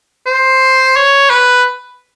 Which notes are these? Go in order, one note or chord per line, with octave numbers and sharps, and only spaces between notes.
C5
C#5
B4